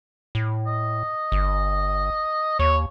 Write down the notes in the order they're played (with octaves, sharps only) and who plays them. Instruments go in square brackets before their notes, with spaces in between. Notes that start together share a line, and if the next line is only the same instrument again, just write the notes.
[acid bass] A2
[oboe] D#5
[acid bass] G1
[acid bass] D#2 [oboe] C#5